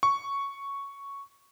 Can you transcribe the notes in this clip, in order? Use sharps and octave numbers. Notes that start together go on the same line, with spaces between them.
C#6